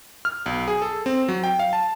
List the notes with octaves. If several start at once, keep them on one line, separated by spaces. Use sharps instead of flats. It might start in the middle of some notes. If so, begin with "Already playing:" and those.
F6
B1
G#4
A4
C4
F#3
G5
F5
A5